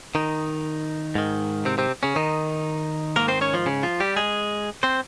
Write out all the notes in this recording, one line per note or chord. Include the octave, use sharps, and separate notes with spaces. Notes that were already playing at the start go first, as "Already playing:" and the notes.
D#3 D#4
G#2 D#3
C3 C4
C3 C4
C#3 C#4
D#3 D#4
G#2 D#3 A#3 A#4
C4 C5
C#4 C#5
F3 F4
C#3 C#4
F3 F4
G3 G4
G#3 G#4
C4 C5